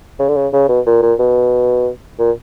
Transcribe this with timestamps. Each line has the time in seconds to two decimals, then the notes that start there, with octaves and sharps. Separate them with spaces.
0.19 C#3
0.29 D3
0.36 C#3
0.53 C#3
0.69 B2
0.86 A#2
1.02 A#2
1.19 B2
2.19 A#2